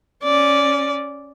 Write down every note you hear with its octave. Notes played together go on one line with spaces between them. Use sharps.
C#4 D5